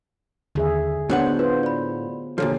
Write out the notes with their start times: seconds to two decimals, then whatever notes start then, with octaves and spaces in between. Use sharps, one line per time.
0.55 D#2 D3 G#4 E5
1.10 A2 B3 D4 F#4 C5 C#5 F#5
1.39 F4 B4 C5
1.63 D5 B5
2.38 A#2 D3 F3 G4 A4 C#5